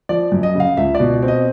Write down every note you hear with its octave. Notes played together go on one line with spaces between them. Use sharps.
F3 D5
F#2
D#5
C#3 F5
C#2 E5
D5
B2
C4
D#5